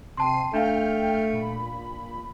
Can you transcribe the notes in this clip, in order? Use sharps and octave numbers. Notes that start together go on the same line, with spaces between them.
C3 G5 A5 C6 C7 D#7
A3 D4 F5 G5 F6 G6
A#2 B5